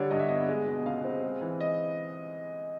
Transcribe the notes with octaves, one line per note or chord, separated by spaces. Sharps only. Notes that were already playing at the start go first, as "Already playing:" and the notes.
Already playing: D3 G3 C#5 D5
G2 D#5
E5
B3 D#5
G#3
B2
C#2 F5
C4
G#3
E3
D#5